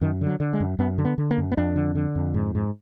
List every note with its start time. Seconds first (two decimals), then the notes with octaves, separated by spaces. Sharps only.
0.01 F#2 D#3
0.21 D3
0.27 F#3
0.40 D3
0.53 G#3
0.60 F#2
0.79 F#2 B3
0.98 D3
1.05 B3
1.18 D3
1.31 A#3
1.38 F#2
1.52 B3
1.57 F2 D4
1.76 D3
1.95 D3
2.15 F2
2.34 G#2
2.55 G#2